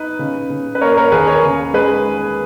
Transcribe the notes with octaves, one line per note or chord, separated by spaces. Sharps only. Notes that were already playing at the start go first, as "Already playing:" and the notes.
Already playing: D#4 B4
C#3
C#3
B4
A#3 A#4 C#5
A#4 C#5
D#2 G#4 B4
A#4 C#5
C#3
G#3 G#4 B4